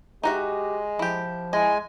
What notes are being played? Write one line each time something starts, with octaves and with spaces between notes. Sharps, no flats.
G#3 D#4 F#4 G4 E5
F3 E4 G4
G#3 E4 D#5 G#5